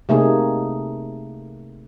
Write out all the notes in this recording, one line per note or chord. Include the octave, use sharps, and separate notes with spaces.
C3 A3 A#3 D#4 G#4